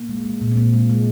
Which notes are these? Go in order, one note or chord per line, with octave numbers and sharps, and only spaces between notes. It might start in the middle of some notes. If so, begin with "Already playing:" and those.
Already playing: A#3
G#3
G#3
A#2
C4
A#2 A#3
G#3
G#3